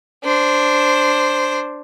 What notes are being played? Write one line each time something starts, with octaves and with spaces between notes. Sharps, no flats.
D4 C5